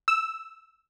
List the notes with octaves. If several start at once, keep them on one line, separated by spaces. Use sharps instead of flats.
E6